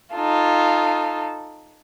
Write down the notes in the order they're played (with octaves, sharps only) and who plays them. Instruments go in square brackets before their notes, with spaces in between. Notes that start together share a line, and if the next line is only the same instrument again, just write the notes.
[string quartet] D#4 F4 A4